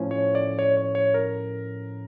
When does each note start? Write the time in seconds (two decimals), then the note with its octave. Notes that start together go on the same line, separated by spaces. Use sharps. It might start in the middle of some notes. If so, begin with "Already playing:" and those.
Already playing: A2 F3 C#4
0.11 C#5
0.35 D5
0.59 C#5
0.77 C#5
0.95 C#5
1.14 A#4